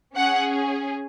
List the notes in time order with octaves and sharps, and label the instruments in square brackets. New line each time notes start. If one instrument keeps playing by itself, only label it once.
[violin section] C#4 G#4 F#5